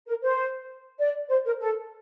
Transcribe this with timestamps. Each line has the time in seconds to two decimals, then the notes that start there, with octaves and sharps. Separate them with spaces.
0.07 A#4
0.22 C5
0.99 D5
1.29 C5
1.45 A#4
1.60 A4